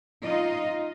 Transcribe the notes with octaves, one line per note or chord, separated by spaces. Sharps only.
D#4 F4 D#5